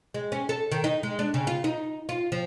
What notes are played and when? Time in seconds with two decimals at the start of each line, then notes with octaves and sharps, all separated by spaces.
0.14 G#3
0.32 C#4
0.49 A4
0.72 D#3
0.84 D#4
1.03 G#3
1.19 D4
1.34 C#3
1.47 F4
1.64 D#4
2.09 F4
2.32 F3